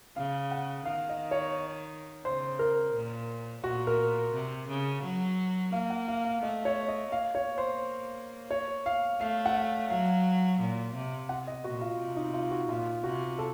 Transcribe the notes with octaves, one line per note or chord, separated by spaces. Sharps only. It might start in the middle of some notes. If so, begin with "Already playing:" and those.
C#3 F5
F#5
D#3 F5
D#5
C#5
C#3 C5
A#4
A#2
A#2 F#4
A#4
C3
C#3
F#3
A#3 F5
F#5
F5
F5
A3 D#5
C#5
D#5
A#3 F5
C#5
C5
C#5
F5
A3 F5
F#5
F5
F#3 F5
A#2
C3
F#5
D#5
A#2 F#4
F4
C3
D#4
F4
F#4
A#2 F4
C3 F#4
A4